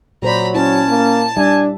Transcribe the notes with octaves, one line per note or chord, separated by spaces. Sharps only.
A#2 F#3 C5 D5 A#5 B5
C#4 E4 C#5 A5
A#3
G3 D4 E5 G#5